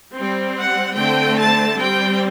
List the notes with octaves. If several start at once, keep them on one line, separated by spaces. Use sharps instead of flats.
G3 C4
F#5
D3 A3 C4 G5
A5
G3 C4 G5